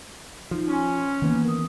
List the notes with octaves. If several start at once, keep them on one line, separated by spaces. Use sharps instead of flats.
F3 D#4
C#4 G#5 C6
D#3 E3 A#3 B3
A#4 D#6